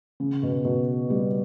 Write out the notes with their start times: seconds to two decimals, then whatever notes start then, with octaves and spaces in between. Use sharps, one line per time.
0.20 C#3
0.43 B2
0.65 B2
1.10 G3